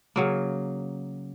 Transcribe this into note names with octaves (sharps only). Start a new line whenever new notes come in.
C#3 F#3 A#3